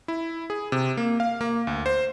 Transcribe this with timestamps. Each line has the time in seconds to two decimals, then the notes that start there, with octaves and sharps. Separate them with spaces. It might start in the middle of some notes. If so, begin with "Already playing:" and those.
0.08 E4
0.50 G#4
0.72 C3
0.97 A#3
1.20 F5
1.41 A#3
1.67 D2
1.86 C5